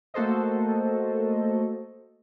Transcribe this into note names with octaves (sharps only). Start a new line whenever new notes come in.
A3 A#3 F#4 A4 C5 D#5